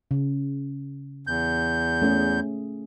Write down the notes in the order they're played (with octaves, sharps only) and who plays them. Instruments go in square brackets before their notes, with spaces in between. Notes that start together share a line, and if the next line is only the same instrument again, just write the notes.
[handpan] C#3
[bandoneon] E2 G6
[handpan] A3 C#4 G#4